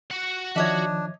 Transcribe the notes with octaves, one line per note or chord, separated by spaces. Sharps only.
F#4 F#5
D#3 F3 D4 C#5 D#5 E5